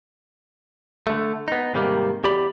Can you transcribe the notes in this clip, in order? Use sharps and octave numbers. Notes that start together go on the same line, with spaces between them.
D3 A3
B3 D#4
G#2 C3 D#3 G3 A3 A#3
E2 G4 D5 B5